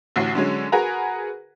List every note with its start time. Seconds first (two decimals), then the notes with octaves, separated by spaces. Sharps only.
0.16 A1 D2 A2 F#4 C7
0.35 D3 F#3 G#3 C#4
0.72 F#4 G#4 A#4 B4 F#5 A#5